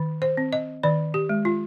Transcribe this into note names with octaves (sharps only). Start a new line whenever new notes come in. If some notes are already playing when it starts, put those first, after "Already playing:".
Already playing: D#3
C5
C4
D#5
D#3 D5
G4
G#3
F4